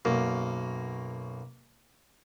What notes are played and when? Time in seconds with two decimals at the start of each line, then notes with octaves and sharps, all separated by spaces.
0.05 B1 F#2 A#3